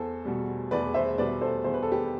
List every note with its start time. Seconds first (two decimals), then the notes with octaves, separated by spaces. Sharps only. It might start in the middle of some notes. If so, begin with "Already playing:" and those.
Already playing: E2 A4 C5
0.25 B2 G3
0.71 E2 B4 D5
0.94 C5 E5
1.18 B2 G3 B4 D5
1.41 A4 C5
1.64 E2 C5
1.74 B4
1.83 A4
1.92 G4 B4